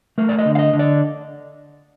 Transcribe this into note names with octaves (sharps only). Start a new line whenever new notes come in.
A3 A#4
D5
D#5
D3
F5
D#5
D3
D5